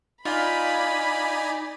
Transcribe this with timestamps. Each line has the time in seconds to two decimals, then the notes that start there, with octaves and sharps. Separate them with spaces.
0.25 D#4 F4 D5 G#5 B5